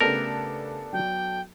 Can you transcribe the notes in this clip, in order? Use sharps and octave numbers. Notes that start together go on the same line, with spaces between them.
C#3 A3 B3 D4 G4 A4 A#4
F#3 G5